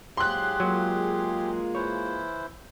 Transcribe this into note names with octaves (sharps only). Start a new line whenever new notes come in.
G#2 F#3 F4 G4 G#4 C6 F#6
F#3 G#3 A#3 F4
E3 E4 C5 C#5